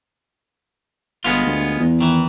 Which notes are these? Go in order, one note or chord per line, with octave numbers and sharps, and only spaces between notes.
G1 G#3 B3 F4
D2
E2
D#3 E3